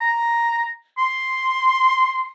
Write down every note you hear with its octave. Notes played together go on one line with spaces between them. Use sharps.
A#5
C6